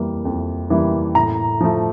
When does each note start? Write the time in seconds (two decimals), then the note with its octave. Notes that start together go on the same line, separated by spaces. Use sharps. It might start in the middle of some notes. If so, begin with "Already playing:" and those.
Already playing: F2 E3 G3 A#3
0.25 F2
0.70 E3 G3 A#3
1.15 A2 A#5
1.61 F3 A3